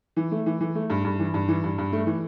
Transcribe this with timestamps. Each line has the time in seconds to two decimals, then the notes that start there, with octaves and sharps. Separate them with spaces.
0.16 E3
0.31 A3
0.46 E3
0.61 E3
0.75 A3
0.90 G2
1.05 G2
1.19 E3
1.34 G2
1.48 E3
1.64 G2
1.78 G2
1.92 A3
2.07 E3